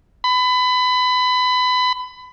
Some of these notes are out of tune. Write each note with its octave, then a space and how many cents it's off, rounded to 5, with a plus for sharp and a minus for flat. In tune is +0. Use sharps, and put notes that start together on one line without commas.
B5 +25